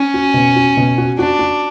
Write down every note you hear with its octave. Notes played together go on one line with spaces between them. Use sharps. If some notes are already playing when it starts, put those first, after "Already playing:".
Already playing: C#4
F#4
B2
F#4
B2
F#4
D4 F#4
F#4